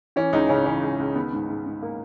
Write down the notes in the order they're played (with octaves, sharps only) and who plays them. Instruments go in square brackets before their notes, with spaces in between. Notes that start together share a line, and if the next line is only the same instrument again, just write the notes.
[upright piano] E3 C#4
C#2 D#4
C#3 C#4
E3 C#4
C#2
C#2
D#3 B3
G#2
G#2
G#2
A#3